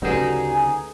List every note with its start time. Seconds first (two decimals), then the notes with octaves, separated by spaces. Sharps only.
0.02 D2 C#3 F#3 G3 D#4 G#4 A4 B4
0.50 G#5